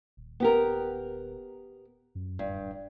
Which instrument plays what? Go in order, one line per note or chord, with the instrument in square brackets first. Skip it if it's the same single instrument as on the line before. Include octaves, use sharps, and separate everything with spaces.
[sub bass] D#1
[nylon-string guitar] B3 G4 A#4
[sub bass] F#2
[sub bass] D1 [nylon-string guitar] G2